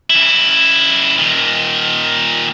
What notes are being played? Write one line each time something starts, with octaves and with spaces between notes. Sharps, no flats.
C#3 E4
A#2 D#3